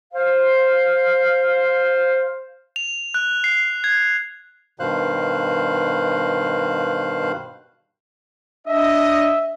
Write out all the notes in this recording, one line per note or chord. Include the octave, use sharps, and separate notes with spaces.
C5 F5
F7
F#6
C7
G#6
G2 B2 D#3 C5 F5 F#6
D4 D#5 E5